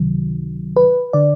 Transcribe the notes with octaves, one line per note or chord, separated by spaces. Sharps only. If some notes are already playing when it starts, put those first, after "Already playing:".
Already playing: C#2 C3 D#3 F#3
B4
D3 D5